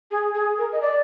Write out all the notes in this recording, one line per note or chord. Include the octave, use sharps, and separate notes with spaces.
G#4
G#4
A#4
D#5
D5